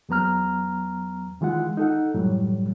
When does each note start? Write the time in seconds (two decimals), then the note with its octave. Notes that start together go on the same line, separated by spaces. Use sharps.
0.09 E2 F#3 B3 A#5 F6
1.41 D#3 E3 G#3 F4 F#5
1.77 D#4 A4 F#5
2.14 F#2 A2 E3 F#3 G3